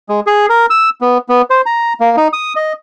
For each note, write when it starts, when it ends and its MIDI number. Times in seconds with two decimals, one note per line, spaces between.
0.09 0.20 56
0.27 0.46 68
0.49 0.66 70
0.70 0.90 88
1.01 1.18 59
1.29 1.42 59
1.50 1.61 72
1.66 1.93 82
2.00 2.16 58
2.17 2.28 63
2.33 2.53 87
2.56 2.73 75